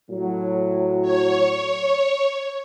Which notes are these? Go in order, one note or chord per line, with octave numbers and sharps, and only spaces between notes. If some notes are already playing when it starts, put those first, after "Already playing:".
A2 F#3
C#5